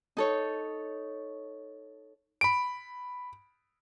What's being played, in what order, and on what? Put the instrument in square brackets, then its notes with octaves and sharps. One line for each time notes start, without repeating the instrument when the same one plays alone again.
[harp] D#4 A4 C#5
[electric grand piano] B5 D7